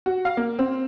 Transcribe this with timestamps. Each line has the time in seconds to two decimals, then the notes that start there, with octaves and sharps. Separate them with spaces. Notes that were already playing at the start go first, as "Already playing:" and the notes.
0.06 F#4
0.25 F5
0.37 A#3
0.59 C4